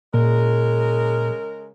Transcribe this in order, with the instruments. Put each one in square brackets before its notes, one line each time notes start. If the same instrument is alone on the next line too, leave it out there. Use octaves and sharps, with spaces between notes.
[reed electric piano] A#2 [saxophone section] C#3 G#3 A#4